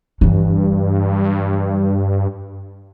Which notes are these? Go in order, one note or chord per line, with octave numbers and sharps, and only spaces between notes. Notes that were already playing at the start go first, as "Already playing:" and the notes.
G2 E3 F#3